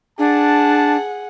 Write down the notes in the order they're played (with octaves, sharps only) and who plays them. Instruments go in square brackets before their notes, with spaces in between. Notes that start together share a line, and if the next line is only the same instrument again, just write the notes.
[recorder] D4 [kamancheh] G#4 F#5 [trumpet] A5